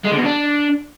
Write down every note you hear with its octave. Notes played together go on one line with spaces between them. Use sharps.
G#3
D3
B2
D4